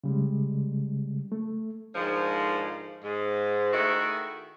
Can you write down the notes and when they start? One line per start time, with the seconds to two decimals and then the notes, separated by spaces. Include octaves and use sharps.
0.04 C#3 G3 G#3
1.32 A3
1.95 G#2 D3 D#3 F3
3.04 G#2
3.73 D#3 A3 E4 F#4 G#4